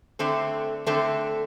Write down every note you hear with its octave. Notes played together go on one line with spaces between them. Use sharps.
D3 A3 C4 A4
D3 A3 C4 A4